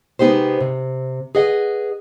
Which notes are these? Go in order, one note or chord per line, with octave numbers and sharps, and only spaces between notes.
C3 G#3 B3 D#4 G4 C5
C3
G#4 B4 D#5 F#5